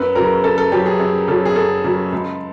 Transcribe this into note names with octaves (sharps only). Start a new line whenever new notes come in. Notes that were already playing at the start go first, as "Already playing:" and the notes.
Already playing: F#2 B4
C#3 F#3 A#4
F#2 A4
A4
C#3 F#3 G4
G#4
F#2
C#3 F#3 A4
G#4
F#2 A4
C#3 F#3
C#2